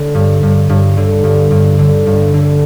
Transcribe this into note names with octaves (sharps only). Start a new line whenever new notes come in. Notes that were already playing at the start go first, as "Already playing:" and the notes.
Already playing: D3
G2
G2
G2
D3
G2
G2
D3
G2
D3